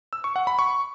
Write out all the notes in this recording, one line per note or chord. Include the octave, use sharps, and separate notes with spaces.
E6
C#6
F#5
B5
C#6